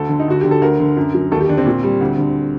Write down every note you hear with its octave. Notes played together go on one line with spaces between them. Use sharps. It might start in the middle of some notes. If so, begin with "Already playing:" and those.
Already playing: D2 A4
D3
D#4
D2 F#4
D3 G4
A4
D2 A#4
D3
F#2
F#3
D#2 A4
G4
D3 D4
C4
A#2
G3
D2
D3